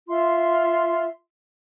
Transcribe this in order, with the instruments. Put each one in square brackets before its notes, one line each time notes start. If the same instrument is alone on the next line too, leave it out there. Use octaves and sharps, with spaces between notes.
[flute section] F4 E5 C6